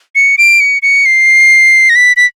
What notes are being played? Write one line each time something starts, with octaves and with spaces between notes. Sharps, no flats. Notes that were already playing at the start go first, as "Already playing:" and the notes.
C#7
D7
C#7
C#7
C7
A#6
B6
B6